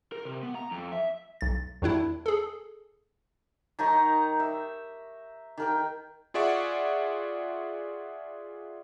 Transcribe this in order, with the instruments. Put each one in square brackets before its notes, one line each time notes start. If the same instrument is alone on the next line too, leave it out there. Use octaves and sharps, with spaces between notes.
[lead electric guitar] A#4
C3
B3
A#5
F2
E5
[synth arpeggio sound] B1 A6
E2 D#3 D4 E4
G#4 A4
[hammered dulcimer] D#3 D#4 A#5 C#6
E5
D#3 A#4 G5
[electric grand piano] F4 G#4 D5 E5 F#5 C#6